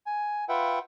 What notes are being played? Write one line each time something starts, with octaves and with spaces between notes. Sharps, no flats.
G#5
F4 B4 E5 F#5 G5